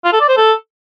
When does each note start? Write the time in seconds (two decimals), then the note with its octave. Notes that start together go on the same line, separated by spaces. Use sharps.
0.05 F4
0.13 A4
0.21 D5
0.29 C5
0.37 A4